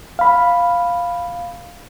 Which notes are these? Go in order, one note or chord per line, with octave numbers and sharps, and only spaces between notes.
F5 B5